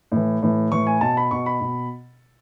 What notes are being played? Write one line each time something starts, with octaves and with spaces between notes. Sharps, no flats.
A2 E3
A2 E3
A2 E3 C#6
G#5
B2 A5
B5
B2 C#6
B5
B2